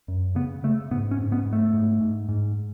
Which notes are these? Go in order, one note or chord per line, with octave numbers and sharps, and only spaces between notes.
F#2
C#3 B3
C#3 A3
G#2 B3
C#4
G#2
B3
G#2
A3
G#2
G#2
G#2